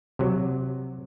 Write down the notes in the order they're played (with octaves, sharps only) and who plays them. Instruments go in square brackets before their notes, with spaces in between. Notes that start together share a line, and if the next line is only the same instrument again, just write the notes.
[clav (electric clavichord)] C3 F#3